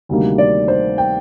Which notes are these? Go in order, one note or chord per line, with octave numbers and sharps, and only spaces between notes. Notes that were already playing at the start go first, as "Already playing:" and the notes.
D2 C3 D#3 G3 A#3
D5
C5
G5